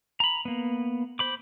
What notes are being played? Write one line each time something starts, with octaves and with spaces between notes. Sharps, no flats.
A#5 B5
A#3 B3
C5 B5 D6